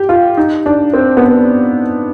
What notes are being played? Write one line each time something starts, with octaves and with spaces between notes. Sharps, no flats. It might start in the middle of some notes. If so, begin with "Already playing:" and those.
Already playing: G4
F4
D#4
D4
C4
B3
C4